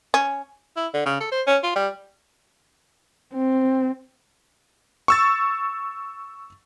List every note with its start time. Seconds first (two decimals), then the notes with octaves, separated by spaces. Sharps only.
0.14 C#4
0.77 E4
0.94 D3
1.05 C#3
1.20 A4
1.31 C5
1.47 C#4
1.63 F4
1.76 G3
3.34 C4
5.08 C#6 E6 A6